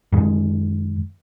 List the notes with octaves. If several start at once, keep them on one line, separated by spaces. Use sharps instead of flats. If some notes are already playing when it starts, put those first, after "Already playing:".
F#2 D#3 G#3